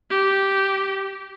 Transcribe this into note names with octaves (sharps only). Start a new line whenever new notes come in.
G4